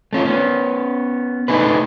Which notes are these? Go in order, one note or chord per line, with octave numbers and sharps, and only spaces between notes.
A3 C#4 F4
B3 C#4
A3 D#4 E4 G#4 B4